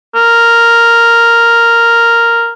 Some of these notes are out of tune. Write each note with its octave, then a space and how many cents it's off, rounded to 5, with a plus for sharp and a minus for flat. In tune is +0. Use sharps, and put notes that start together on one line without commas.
A#4 -5